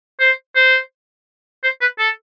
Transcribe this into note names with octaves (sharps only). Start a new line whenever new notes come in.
C5
C5
C5
B4
A4